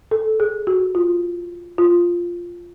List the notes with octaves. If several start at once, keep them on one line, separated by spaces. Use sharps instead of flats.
A4
G#4
F#4
F4
F4